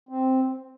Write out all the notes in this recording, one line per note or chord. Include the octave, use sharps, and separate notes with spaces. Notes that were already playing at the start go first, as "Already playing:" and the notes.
C4